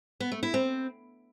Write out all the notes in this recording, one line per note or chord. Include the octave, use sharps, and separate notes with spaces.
B3
A3
E4
C4